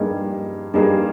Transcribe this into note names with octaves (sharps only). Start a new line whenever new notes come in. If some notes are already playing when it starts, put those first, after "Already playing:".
Already playing: G2 G3 A#3 D#4 G#4
G2 G3 A#3 D#4 G#4